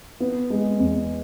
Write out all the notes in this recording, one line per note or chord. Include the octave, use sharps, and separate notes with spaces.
B3
G#3
E2